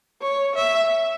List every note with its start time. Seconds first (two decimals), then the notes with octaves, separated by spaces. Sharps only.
0.22 C#5
0.55 E5